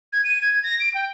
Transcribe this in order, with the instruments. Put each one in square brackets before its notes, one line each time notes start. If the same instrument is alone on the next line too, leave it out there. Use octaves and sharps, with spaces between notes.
[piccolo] G#6
D#7
G#6
A#6
D7
G5